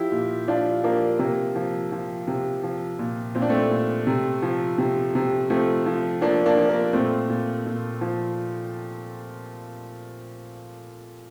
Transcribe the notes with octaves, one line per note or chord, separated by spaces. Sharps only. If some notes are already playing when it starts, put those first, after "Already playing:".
Already playing: F3 E4 G4
A#2
F3 D4 F4
F3 A#3 D4
C3 A#3
F3
F3
C3
F3
A#2
A#2 C4
D4
A3 C4
A#2
C3
F3
C3
C3
F3 A3 C4
F3
F3 A#3 D4
A#3 D4
F3
A#3
A#2 A3 C4
A#2
A#2
F3